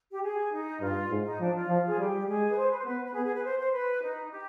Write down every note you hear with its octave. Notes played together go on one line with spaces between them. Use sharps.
G4
G#4
D#4
G2 F4
G#2
D#4
F3 D4
F4
F3
G#4
G3 G4
G#3 G#4
B4
C5
B4
C5
B3 B4
B4
B3 G#4
G#4
B4
C5
C5
B4
D#4
G4